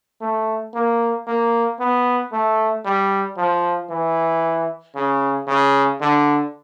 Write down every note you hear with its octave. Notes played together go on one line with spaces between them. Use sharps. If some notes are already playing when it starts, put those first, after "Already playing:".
A3
A#3
A#3
B3
A3
G3
F3
E3
C#3
C#3
D3